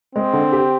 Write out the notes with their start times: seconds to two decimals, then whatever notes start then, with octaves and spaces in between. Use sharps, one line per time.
0.15 G#3 C4
0.33 D3
0.52 G4